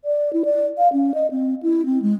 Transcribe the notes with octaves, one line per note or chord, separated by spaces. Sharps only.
D5
E4
D5
F5
C#4
D#5
C4
E4
C4
G#3